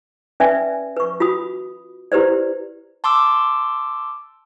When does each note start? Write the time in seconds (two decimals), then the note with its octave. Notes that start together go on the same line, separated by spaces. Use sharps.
0.40 C#4 B4 D5 E5 G#5
0.97 B4 C#6
1.20 F4 F#4 B5 D#6
2.12 E4 G4 B4 C5 D5
3.04 A5 C6 D6 E6